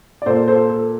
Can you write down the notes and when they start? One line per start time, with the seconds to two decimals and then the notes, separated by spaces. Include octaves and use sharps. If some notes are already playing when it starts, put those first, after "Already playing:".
0.22 D5
0.26 A#2 A4 C5
0.48 A4 C5
0.70 A4